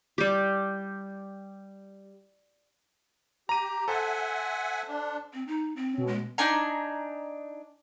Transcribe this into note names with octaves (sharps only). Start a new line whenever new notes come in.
G3 G4
G4 A#5 D#7
A4 C5 E5 F#5 G#5
D4
C4
D#4
C4
B2 C#4
G#3
D4 D#4 G#5 A#5